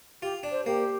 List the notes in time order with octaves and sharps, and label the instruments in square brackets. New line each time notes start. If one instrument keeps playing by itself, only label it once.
[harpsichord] F4 [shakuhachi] G4
[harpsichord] D4
[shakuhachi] C5
[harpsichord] A#3 [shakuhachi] G4